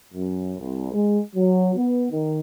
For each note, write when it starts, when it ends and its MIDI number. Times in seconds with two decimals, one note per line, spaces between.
0.13 0.52 42
0.58 0.90 36
0.93 1.19 56
1.36 1.73 54
1.76 2.05 59
2.11 2.40 51